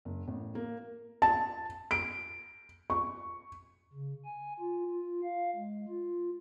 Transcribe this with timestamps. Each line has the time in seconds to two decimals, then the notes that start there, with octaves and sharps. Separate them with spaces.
0.05 F#1
0.28 A1
0.55 A#3
1.22 A5
1.91 D7
2.90 C#6
3.93 C#3
4.25 G#5
4.60 F4
4.91 F4
5.23 F5
5.55 G#3
5.89 F4